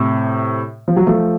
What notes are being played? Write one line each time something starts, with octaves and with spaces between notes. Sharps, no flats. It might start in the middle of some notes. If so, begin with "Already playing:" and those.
Already playing: A2 C3
F3
F#3
F3 A3